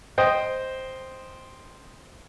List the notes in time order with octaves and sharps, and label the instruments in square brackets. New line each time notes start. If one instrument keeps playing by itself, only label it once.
[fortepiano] C5 D#5 G5